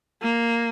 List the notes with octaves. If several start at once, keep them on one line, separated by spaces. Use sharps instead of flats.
A#3